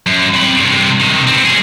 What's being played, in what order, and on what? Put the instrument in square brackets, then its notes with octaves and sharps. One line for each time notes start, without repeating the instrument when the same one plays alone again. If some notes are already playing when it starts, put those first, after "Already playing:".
[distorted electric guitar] F#2
C4 B5
G2 C3
C3 D#3
B3 C4
G3 G#4